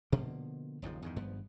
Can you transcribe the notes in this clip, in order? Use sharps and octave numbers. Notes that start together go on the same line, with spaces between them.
B2 D3 F3 A#3
F#1 D#2 G#2 F3
E2 G2 D#3
G#1 G2 F3 B3